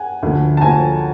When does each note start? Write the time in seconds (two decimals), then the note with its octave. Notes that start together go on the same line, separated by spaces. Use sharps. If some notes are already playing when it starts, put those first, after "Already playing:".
Already playing: F#5 G#5
0.23 D2 D3 F3 A3
0.57 A5
0.61 D2 D3 F3 A3 G#5 A#5